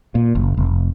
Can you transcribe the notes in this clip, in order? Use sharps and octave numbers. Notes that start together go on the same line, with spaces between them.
A#2
F#1
F1